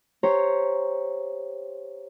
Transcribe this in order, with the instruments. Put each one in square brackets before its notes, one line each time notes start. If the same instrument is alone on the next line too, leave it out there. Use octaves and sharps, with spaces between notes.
[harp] G4 C5 C#5 A#5